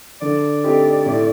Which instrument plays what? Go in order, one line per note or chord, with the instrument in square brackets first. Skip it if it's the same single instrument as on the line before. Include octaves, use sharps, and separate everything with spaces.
[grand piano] D3 [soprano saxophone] D5
[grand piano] A3 C4 D#4 G4
A2